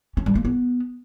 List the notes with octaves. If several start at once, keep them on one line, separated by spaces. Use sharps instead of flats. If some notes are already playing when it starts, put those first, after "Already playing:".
C#4
G3
A#3
B3